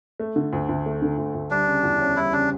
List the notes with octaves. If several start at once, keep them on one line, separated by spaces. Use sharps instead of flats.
A3
D3
D2
D2
A3
D3
D2
D2
G3 D4
C#3
E2
C#4
G3 E4
C#3 D4